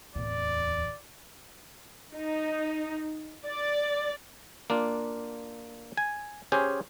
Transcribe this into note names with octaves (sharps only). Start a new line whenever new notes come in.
D1 E2 D5
D#4
D5
A#3 D4 F4
G#5
C#4 G4 G#4 C5